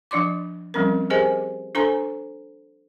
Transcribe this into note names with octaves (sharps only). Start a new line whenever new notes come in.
F3 D4 D5 C6 D6
F3 G3 C4 C#4 A#4
G4 G#4 A#4 C5 D#5 G#5
D4 A4 C5 G#5 A#5 C6